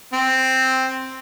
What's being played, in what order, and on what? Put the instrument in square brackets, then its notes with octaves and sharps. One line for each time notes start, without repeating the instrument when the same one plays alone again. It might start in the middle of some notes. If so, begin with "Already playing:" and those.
[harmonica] C4